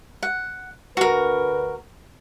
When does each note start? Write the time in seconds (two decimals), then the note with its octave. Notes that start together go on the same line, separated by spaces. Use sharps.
0.23 F#5
0.97 D2 F#4 A#4 B4